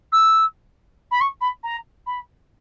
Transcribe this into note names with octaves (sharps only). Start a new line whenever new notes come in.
E6
B5
C#6
B5
A#5
B5